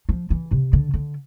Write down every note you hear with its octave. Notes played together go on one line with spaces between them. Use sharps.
F3
E3
C3
D3
D3